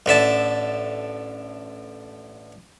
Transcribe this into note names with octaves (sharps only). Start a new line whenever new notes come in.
A1 D3 E5 A5